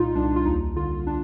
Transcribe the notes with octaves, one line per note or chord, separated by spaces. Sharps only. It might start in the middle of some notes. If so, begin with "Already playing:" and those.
Already playing: C2 A#2 D#4 F4
C2 D4
F4
D#2 D#4
D3 F4
D4